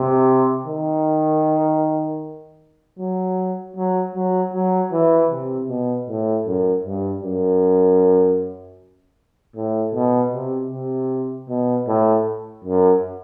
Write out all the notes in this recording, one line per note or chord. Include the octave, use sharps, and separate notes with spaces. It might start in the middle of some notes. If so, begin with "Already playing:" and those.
Already playing: C3
D#3
F#3
F#3
F#3
F#3
E3
C3
B2
A2
F#2
G2
F#2
A2
B2
C3
C3
B2
A2
F#2